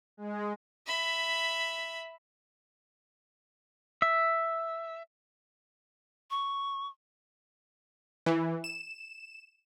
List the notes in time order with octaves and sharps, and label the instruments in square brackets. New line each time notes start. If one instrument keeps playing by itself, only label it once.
[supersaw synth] G#3
[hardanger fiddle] E5 B5
[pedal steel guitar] E5
[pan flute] C#6
[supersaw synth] E3
E7